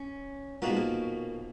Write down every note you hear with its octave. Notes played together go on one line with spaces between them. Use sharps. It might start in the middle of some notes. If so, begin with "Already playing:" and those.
Already playing: C#4
B1 A#2 F3 A#3 B3 F#4
G#3
A#3